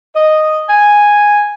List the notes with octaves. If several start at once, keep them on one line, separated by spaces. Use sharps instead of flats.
D#5
G#5